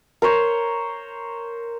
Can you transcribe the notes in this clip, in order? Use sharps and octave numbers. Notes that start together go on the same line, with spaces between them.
A#4 C5 C#5